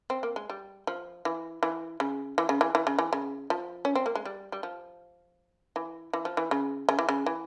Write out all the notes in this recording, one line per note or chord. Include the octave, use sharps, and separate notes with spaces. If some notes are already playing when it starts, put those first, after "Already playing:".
C4
A#3
G#3
G3
F3
E3
E3
C#3
E3
C#3
E3
E3
C#3
E3
C#3
F3
C#4
C4
A#3
G#3
G3
G3
F3
E3
E3
F3
E3
C#3
C#3
E3
C#3
E3